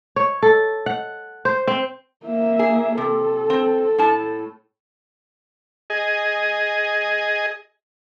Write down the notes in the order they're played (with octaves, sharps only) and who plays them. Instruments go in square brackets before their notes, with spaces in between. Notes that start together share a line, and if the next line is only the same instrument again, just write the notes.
[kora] C#5
A4
F#5
C5
C4
[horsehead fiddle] A#3 E5
[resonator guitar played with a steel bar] G#4
[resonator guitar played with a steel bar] C3 [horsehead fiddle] A4
[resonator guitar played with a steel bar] C4
A2 A5
[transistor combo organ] G#4 D#5